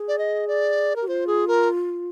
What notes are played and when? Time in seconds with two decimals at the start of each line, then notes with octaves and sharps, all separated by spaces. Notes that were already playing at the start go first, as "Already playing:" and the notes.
Already playing: G#4
0.08 D5
0.18 D#5
0.48 D5
0.96 A#4
1.01 G4
1.08 F4 C5
1.27 G#4
1.48 A#4